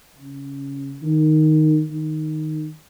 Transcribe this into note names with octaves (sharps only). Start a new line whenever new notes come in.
C#3
D#3
D#3